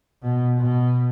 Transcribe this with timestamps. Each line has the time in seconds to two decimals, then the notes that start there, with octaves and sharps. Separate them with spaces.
0.22 B2
0.58 B2